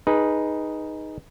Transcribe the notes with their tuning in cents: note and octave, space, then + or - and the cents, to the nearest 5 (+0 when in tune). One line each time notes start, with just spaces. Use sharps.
D#4 +0 G#4 +0 B4 -15